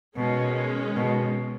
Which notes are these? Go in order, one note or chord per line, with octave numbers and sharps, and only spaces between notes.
B2 D#3 G#3 C#4
B2